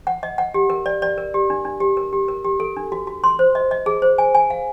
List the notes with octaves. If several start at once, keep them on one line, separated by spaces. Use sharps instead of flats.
F#5
D#5
F#5
G4
A#4
D5
D5
A#4
G4
D4
D4
G4
A#4
G4
A#4
G4
A4
D4
F#4
F#4
C6
C5
D#5
D#5
G#4
C5
G#5
G#5
F5